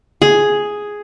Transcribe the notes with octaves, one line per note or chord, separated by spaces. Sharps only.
G#4